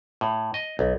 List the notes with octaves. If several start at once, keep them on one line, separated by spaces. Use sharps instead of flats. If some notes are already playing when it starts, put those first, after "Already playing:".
A2
D#5
B1